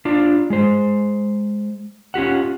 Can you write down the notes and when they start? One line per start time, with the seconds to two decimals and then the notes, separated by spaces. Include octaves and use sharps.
0.05 D4 F4 D5
0.50 G#3 C5
2.14 C#4 F4 G4 F#5